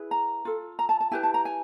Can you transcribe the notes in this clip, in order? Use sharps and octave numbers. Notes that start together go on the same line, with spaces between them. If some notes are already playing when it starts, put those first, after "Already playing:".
Already playing: E4 G#4 B4
A#5
F4 A4
A#5
A5
A5
E4 G4 B4 G#5
A5
A#5
G#5